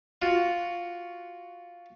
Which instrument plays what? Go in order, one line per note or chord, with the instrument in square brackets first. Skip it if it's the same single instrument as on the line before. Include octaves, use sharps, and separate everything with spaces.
[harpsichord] F4 F#4